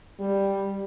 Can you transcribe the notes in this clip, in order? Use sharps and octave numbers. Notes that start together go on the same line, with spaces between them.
G3